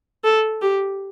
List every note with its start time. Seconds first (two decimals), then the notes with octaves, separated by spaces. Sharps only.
0.24 A4
0.62 G4